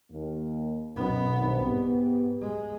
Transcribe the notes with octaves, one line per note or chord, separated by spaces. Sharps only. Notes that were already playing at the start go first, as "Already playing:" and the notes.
D#2 A#3
B1 F#2 B3 D#4
G2 D#3 C4
G#2 B3 G4
G#3